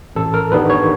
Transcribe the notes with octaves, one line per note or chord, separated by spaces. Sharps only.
A1 A4
A#4
G2 D#3 G3 B3 B4
C#5